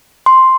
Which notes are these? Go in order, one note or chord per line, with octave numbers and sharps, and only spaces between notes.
C6